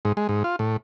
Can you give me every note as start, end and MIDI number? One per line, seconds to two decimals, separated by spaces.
0.05 0.13 44
0.17 0.27 56
0.29 0.43 44
0.44 0.56 65
0.59 0.77 45